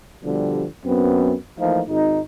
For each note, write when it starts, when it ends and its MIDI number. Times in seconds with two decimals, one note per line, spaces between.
0.24 0.65 47
0.24 0.65 50
0.24 0.65 53
0.24 0.65 55
0.85 1.34 42
0.85 1.34 59
0.85 1.34 60
1.59 1.82 52
1.59 1.82 53
1.59 1.82 57
1.59 1.82 58
1.59 1.82 63
1.59 1.82 65
1.88 2.19 32
1.88 2.19 63